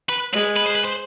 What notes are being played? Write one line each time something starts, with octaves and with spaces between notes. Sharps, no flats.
B4
G#3 B4
B4
C5
B4
C5